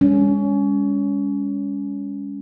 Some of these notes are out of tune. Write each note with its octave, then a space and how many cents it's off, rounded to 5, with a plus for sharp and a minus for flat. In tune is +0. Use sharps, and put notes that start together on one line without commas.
G#3 -40 C#4 +25